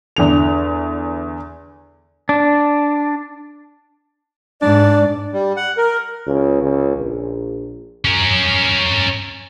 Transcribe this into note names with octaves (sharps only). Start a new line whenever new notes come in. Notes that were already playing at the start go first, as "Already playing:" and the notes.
E2 D3 F7
D4
G#2 D4 D5
G3
F#5
A#4
C#2
C#2
A#1
C#4 A#4